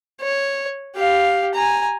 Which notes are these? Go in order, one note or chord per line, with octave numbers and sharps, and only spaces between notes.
C#5
G4 F5
G#5 A#5